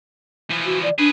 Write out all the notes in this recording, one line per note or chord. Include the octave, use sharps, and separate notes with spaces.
E3 F3
F#4
D5
D4 G#4 B4